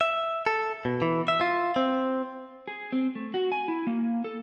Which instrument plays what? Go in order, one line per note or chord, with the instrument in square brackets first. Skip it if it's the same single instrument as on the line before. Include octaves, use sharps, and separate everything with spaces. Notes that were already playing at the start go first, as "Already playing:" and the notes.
[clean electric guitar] E5
A4
B2
E3
E5
F4
C4
[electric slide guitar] G#4
C4
A3
F#4
G#5
E4
A#3
A4